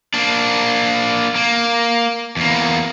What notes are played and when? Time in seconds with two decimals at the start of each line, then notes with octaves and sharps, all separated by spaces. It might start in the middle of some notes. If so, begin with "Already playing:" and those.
0.14 A#3 D4
1.36 A#3
2.37 E2 A#3